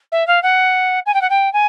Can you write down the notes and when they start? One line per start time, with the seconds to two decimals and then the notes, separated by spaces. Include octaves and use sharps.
0.12 E5
0.27 F5
0.43 F#5
1.06 G#5
1.14 G5
1.21 F#5
1.30 G5
1.53 G#5